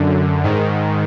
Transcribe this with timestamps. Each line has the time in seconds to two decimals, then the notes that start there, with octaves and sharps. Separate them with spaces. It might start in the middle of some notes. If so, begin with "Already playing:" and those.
Already playing: F#2 D3
0.43 G#2 D#3